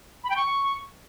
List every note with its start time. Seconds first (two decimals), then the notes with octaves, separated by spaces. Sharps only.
0.24 B5
0.30 G5
0.36 C#6